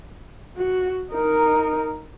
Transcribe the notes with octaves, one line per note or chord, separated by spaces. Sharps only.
F#4
D#4 A#4